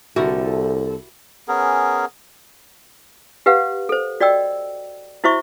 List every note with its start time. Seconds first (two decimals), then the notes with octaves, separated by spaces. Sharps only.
0.16 C2 D3 E4 F#4 G4 A4 A#4
1.48 B3 C#4 G#4 A#4
3.46 G4 B4 F5 F#5
3.89 A4 C5
4.20 F#4 D5 D#5 G5 E6
5.24 E4 F#4 C5 E5 C#6